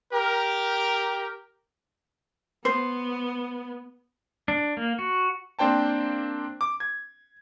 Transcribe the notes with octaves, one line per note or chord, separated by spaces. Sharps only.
G4 A#4
B3 C5
D4
A#3
F#4
A#3 C4 D4 C5 G5 A5
D6
G#6